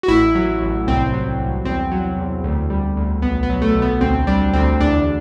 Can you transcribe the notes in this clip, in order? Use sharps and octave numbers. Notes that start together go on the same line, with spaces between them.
F#4
A1 E4
F#3
A1
C2 C4
F#3
C2
E2 C4
F#3
E2
D2
G3
D2
B1 B3
B3
F#3
A3
B1
B3
D2 C4
G3 D4
D2 C4
E2 D4